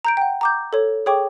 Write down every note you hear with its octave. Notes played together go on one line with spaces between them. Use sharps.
A#5 G6 D7
F#5 G5
A#5 D6 G6
A4 C#5
G#4 C#5 G5 C#6 D6